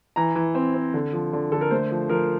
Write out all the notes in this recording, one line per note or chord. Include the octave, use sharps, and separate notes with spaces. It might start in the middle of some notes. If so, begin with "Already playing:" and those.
E3 A#5
E3
C4
C4
D3
F3
D3
D3 A4
A#4
A3 C5
F3
F3 A#4